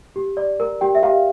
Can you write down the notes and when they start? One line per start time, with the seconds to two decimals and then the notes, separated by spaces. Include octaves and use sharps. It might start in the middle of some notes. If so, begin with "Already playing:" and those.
0.16 G4
0.37 D5
0.60 A#4
0.81 G4 G5
0.95 E5
1.03 G4 F5